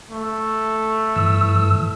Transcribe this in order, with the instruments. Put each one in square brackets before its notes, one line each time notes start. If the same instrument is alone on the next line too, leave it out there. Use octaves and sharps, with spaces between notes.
[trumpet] A3
[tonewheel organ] G2 E3 E6